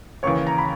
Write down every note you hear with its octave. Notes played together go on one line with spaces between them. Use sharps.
D#2 C#3 E3 C#5 C#6
A#5
B5